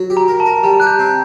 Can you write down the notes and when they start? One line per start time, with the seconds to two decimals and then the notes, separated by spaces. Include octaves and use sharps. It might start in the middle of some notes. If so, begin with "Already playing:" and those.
Already playing: F#3
0.10 G4
0.17 A#5
0.28 A#4
0.40 A5
0.46 A#4
0.63 G3 A#5
0.80 G4 F#6
0.87 G6
0.99 C4